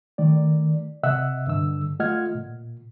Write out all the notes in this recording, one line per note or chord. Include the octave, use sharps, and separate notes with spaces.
D#3 A3 D5
C3 D#5 E5 F#5 E6 F#6
G2 D3 E6
A3 F4 D#5 F#5 F6 G#6
A#2